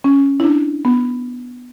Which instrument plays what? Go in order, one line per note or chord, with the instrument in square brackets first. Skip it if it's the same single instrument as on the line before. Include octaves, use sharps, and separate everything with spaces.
[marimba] C#4
E4
D4
B3